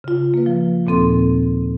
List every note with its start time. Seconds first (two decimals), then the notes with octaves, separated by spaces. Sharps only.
0.04 C#3 F4
0.34 A#3 B4
0.46 F3
0.86 D#2 A#2 A#3 C4 A4 C6